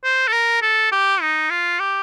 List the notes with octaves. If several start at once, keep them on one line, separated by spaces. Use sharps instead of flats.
C5
A4
A#4
A4
G4
D#4
F4
G4